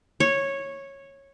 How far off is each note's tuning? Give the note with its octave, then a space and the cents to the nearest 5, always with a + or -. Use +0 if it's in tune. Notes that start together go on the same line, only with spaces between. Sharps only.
C#5 -10